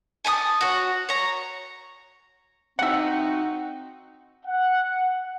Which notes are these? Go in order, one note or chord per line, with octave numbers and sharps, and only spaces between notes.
G#5 A5 B5 D#6
F#4 C#5
C#5 A#5
C4 D#4 F#4 E5 F#5
F#5